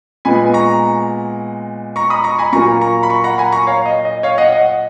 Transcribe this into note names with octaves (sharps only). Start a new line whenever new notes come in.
A#2 G#3 B3 G#5 B5
A#5 C#6
A#5 C#6
B5 D#6
A#5 C#6
G#5 B5
A#2 F#3 A#3 A#5 C#6
A#5 C#6
B5
A#5 C#6
F#5 A#5
G#5 B5
A#5 C#6
C#5 F5
D#5
D#5
C#5 F5
D#5 F#5
D#5 F#5